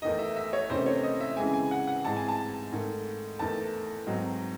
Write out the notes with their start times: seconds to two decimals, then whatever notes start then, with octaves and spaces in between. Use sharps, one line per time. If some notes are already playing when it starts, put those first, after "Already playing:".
0.02 E2 D#3 A3 D#4 D#5
0.19 E5
0.36 E5
0.53 C#5
0.70 E2 C3 D#3 A3 C#4 C5
0.86 C#5
1.03 D#5
1.21 E5
1.37 C#3 E3 G#3 C4 G#5
1.54 G#5
1.71 F#5
1.87 F#5
2.05 G#2 E3 G#3 C4 D#4 A5
2.17 G#5
2.28 A5
2.72 G#2 D#3 A3
3.39 E2 D#3 A3 A5
4.07 G#2 F#3 C4 D#4